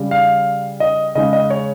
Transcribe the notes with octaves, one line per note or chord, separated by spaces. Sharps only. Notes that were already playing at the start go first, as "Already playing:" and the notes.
Already playing: C#3 G3
F5
D#5
C#3 G#3 D#5
D#5
C#5